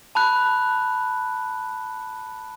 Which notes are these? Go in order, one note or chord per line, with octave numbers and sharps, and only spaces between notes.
A5 B5 F#6